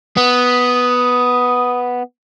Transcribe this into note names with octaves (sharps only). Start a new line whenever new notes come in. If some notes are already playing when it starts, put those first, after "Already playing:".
B3 D#6